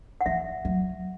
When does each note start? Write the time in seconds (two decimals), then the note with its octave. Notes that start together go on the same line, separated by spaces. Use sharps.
0.21 F#5
0.26 E3 E5
0.65 F#3